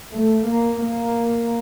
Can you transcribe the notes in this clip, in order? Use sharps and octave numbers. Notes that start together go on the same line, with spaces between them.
A3
A#3
A#3